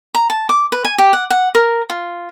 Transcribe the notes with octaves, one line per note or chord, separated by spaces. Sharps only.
A#5
A5
D6
B4
G#5
G4
F#5
F#5
A#4
F4